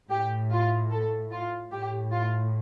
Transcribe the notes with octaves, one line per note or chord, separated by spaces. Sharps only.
A2 G4
F4
A4
F4
A2 G4
F4